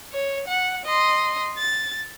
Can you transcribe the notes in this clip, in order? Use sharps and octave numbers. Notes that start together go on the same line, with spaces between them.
C#5
F#5
D#5 C6
A6